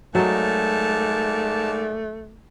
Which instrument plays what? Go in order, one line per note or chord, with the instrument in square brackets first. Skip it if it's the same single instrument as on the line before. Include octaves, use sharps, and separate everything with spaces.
[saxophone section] G#2 A#3 D5 [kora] F#3 D#5 [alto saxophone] A3 [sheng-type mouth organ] A5